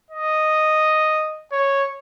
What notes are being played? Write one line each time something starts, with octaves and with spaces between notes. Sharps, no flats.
D#5
C#5